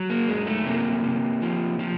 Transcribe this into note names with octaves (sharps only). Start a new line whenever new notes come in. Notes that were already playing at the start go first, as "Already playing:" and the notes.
Already playing: F#3
A#3
F#2 G#3
A3
C3 A#3
C3
F3
F3